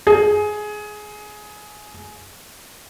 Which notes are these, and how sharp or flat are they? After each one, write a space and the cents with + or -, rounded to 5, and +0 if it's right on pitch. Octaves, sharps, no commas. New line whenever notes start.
G#4 +15